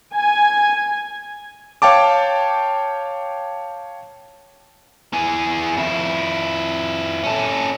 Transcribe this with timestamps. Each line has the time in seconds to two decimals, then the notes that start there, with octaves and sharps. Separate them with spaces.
0.14 G#5
1.82 C#5 F5 G5 A5 D6
5.13 E3 G#4
5.77 F2 E4
7.24 C#4 A4